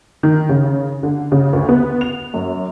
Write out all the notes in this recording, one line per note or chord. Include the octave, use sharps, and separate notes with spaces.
D#3
C#3
D3
C#3
D2
B3
F7
F#2